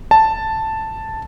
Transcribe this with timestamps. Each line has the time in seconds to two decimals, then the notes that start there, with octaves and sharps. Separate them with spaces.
0.11 A5